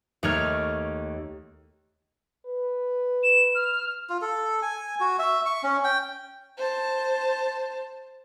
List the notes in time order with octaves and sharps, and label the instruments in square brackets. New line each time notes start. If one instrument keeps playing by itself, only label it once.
[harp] D#2 A3 C#5 F6
[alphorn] B4
[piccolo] E7
F6
[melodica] F4
A4
G#5
F#4
E5
C#6
C#4
G5
[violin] C5 A5